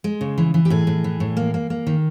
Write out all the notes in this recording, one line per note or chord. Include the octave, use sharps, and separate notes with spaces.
G#3
C#3
E3
E3
G4
A2 G#4
A2
E3
A2
A#3
A#3
A#3
D#3